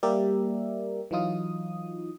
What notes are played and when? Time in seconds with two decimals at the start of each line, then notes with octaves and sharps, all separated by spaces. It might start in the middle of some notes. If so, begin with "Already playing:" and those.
0.03 G3 A#3 G4 A#4 D5 E5
1.11 E3 F#3 D#4 F4 D#6